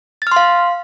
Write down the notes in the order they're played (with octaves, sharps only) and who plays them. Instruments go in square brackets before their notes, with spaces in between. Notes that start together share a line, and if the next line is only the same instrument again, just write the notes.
[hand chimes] A6
F6
C6
F5